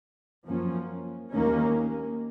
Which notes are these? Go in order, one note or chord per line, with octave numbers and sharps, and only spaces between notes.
F#2 F3 A#3 C#4
D#2 D#3 A#3 C#4